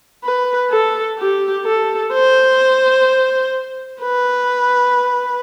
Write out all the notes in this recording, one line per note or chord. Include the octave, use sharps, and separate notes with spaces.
B4
A4
G4
A4
C5
B4